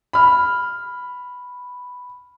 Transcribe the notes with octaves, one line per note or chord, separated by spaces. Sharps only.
B5 F6